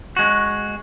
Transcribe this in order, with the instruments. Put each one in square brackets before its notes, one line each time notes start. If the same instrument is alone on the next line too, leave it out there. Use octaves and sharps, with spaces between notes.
[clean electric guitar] G#3 F#4